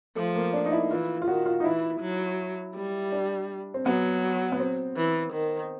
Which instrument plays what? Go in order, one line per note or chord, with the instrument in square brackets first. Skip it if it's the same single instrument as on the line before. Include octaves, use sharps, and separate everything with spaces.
[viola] F3 [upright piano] A3
[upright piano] A#3
D4
D#4
E4
[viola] E3 [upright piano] F4
[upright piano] F4
[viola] D#3 [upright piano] F#4
[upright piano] F4
D#4
[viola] E3 [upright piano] E4
[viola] F#3
G3
[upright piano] D4
C4
[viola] F#3 [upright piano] B3
[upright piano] B3
C4
[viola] E3
D#3